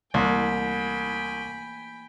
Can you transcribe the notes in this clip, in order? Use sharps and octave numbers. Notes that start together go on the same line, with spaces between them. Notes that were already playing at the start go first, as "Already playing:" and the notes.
C2 E3 A3 A#3 G5 G#5 B5